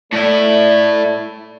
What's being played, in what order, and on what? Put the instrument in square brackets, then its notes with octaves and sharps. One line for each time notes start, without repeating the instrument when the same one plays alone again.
[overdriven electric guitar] A2 E4 [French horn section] A3 D5